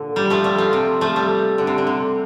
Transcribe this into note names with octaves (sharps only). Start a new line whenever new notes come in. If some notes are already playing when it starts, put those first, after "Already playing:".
Already playing: A#2 D3
G3
F3 A3
G3
F3
C3
F3 A3
G3
D3
C3
D3
C3